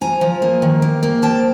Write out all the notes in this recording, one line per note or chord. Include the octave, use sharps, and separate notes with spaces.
F3 G#5 A#5
F3
A#3
D#3
A#3
A#3
F3 G5 A5